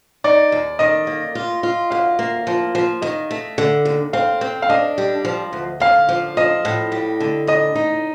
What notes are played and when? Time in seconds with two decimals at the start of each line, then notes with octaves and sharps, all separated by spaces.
0.24 D#4 D5
0.52 D#2
0.79 D#3 D#5
1.07 A#3
1.35 F4
1.63 F4
1.90 D2 F5
2.19 A#3
2.47 F3
2.75 F3
3.02 D#3 D#5
3.31 A3
3.58 D3
3.85 D#2
4.13 C4 F5
4.41 C4
4.62 F5
4.70 D4 D#5
4.98 G3
5.25 F3
5.53 D2
5.80 D3 F5
6.09 F3
6.37 F3 D#5
6.65 A2
6.92 G3
7.20 D3
7.47 A2 D#5
7.75 D#4